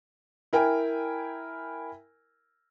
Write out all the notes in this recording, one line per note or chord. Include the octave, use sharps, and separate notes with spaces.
E4 A#4 G5 G#5